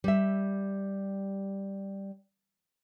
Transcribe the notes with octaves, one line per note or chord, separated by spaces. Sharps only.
G3 E5